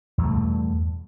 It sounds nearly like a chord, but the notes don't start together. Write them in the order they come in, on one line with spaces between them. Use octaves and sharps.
E2 B2 A3 G2